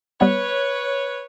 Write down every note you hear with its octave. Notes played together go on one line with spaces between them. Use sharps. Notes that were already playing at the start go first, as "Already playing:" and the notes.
G3 B3 B4 C#5